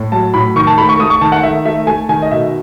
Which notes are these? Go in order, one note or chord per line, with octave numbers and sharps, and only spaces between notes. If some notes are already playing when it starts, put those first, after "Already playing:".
Already playing: A2
F#3 A5
A2 B5
D#3 C#6
A5
A3 B5
C#6
A3 D#6
C#6
D#3 A5
F#5
D#3 E5
A3 E5
A3 G#5
D#3 G#5
D#5
B2 E5